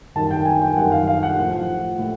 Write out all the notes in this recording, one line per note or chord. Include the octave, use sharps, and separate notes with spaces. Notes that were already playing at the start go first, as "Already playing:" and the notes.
F#2 D#3 G3 A5
G5
G#5
G5
F#2 D#3 G3 F#5
F5
F5
F#5
A2 F3
A2